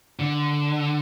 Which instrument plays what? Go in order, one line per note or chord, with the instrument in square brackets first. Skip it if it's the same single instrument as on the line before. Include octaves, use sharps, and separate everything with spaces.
[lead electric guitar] D3